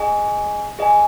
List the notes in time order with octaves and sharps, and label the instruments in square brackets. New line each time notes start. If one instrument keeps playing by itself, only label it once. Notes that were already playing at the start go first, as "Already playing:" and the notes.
Already playing: [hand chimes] G#4 D#5 G#5
G#4 D#5 G#5